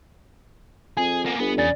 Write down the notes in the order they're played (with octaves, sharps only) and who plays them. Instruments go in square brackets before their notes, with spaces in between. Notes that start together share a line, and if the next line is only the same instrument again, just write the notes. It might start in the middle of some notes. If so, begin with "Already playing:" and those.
[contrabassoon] F2 [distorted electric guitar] G#4 [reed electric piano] G#5
[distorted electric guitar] A#3 B3
[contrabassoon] G1 [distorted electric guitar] B3
[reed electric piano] E2 G#5 A6 [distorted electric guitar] C#3 [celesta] D5